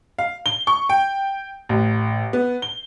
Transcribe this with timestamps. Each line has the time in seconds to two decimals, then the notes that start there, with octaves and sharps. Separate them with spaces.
0.18 F5
0.46 G7
0.67 C#6
0.89 G5
1.69 A1
2.33 B3
2.62 G7